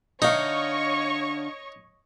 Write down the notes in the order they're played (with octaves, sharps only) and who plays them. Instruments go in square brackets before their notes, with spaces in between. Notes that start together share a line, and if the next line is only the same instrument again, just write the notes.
[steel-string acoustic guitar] D3 F5 [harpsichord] D#4 [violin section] C#5 D#5 C#6